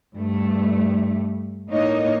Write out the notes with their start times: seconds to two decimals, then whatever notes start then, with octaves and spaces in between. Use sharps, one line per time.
0.16 G2 A3
1.69 A2 A#3 D#4 C#5 D#5